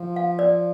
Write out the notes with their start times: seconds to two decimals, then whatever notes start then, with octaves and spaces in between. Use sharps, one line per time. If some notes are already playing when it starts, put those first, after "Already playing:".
Already playing: F3
0.16 F5
0.39 D5